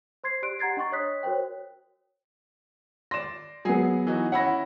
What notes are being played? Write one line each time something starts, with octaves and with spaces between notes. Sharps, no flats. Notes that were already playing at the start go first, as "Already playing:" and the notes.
C5 C6 G#6 C7
G4 D5 C6 F#6 D7
G4 F#5 A#5 G#6 A6 C7
D4 D#5 C6 C#6 A6
C#5 D#5 D#6 F#6 B6
F#4 A#4 C5 C#5 G5
D5 C6 A#6 E7
F#3 B3 G#4 G#5 C7
E3 D#4 F#4
C#4 E4 F#5 B5 A#6